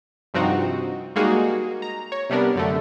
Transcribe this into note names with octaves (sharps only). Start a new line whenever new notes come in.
G2 C3 F3 C4 D#4 F#4
G3 G#3 A#3 D#4 F#4 G#4
A#5
C#5
C3 G3 B3 D4 A#4
F#2 D3 A3